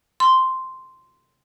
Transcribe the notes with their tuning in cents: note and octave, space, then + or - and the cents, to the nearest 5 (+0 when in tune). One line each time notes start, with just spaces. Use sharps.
C6 -5